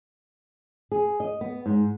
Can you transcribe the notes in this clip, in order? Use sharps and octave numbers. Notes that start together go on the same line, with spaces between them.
G#4
D#5
B3
G#2